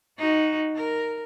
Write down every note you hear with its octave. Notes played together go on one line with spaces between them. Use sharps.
D#4 F#4
A#4